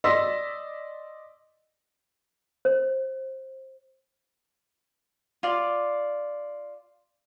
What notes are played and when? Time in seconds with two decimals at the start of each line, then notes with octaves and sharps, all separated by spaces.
0.04 D5 D#5 C6 E6 A#6 B6
2.65 C5
5.43 F4 D5